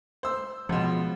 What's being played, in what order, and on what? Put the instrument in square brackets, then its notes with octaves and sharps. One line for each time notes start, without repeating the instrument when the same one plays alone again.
[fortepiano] C5 E6
[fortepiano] C#2 B2 [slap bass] F3